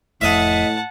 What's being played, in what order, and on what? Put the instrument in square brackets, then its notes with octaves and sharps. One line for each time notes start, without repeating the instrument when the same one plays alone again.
[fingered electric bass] F1 F2 [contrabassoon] A2 [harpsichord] D#5 E5 [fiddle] F#5 A5